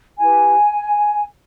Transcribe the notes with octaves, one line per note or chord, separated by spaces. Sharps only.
E4 G4 B4 G#5